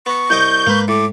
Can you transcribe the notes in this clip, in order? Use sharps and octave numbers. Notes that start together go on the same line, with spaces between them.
B3 C#6
C2 D#5 D6 G6
G#2 G#3 A#3 B4
A2 D6